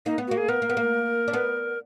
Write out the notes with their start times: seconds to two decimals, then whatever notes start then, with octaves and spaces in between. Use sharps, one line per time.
0.06 A#3 D#4
0.18 B3
0.27 A#3 F#4
0.37 G#4
0.48 B3 A#4
0.62 A#3
0.70 B3
0.77 A#3
1.28 D4
1.33 B3